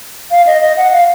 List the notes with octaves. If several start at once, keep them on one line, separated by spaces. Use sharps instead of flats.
F5
D#5
D#5
F#5
F5